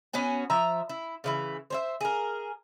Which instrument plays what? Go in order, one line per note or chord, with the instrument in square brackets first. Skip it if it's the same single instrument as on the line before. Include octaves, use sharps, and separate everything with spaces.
[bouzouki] B3 C#4 F#4 G#5
F3 E5 A#5
E4
C#3 E3 E4
C5 C#5 E5
G#4 A#4